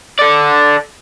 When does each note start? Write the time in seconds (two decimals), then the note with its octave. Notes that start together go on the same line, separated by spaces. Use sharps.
0.19 A4 D5